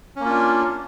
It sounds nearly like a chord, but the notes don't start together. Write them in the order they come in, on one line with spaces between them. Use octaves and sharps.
C#4 A#3 F4 D4